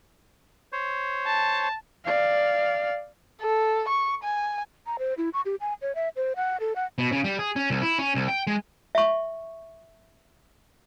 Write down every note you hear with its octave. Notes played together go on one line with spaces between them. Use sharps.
C5 C#5
A5
D5 F5
A4
C#6
G#5
A#5
C5
E4
C#6
G4
G#5
C#5
E5
C5
F#5
A4
F#5
B2
C#3
G3
G#4
C#4
C2
E4
C#4
C2
G5
G#3
E5 C#6